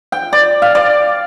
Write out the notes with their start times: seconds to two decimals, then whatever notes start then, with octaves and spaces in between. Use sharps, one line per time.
0.12 G5
0.33 D5
0.62 F5
0.75 D5